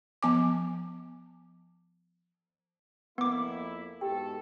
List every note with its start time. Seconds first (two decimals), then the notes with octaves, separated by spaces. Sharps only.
0.23 F3 B3 G#5 D6
3.18 F2 A#3 B3 E4 D6
4.01 G#2 B2 G4 A4 G5